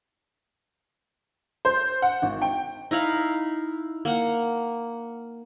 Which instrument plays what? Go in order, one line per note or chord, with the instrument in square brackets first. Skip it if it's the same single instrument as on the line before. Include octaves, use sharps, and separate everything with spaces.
[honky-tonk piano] C5
F#5
G#1
G5
[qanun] D#4 E4 F5 B5
A#3 F#5